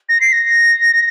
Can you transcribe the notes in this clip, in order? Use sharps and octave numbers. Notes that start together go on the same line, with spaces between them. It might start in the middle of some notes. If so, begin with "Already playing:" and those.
A#6
C7
A#6